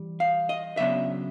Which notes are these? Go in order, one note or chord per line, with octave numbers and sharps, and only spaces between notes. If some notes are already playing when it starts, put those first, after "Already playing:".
Already playing: E3 G3
F5
D#5
C#3 F#3 B3 D4 E5